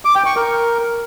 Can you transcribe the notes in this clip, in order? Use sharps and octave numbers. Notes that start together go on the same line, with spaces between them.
D6
G5
C#6
A#4